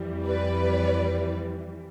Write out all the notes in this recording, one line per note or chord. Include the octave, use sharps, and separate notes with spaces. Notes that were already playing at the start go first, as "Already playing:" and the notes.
Already playing: F2 E3 G3
B4 D5